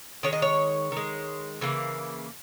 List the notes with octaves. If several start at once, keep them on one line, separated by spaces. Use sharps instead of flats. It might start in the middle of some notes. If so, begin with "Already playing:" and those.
D#3 G#3 C#5
D#5
C#5
D#3 G#3
C#3 E3 A#3